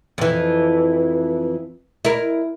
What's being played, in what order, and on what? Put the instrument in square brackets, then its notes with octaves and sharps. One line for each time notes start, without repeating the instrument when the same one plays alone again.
[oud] F2 E3
E4 A#4